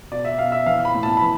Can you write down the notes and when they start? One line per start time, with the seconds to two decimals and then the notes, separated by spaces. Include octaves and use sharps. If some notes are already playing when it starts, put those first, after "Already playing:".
0.11 B2 D5
0.25 E5
0.38 B2 F5
0.52 E5
0.66 E3 F5
0.85 B5
0.95 A2
1.03 A5
1.17 B5
1.22 E3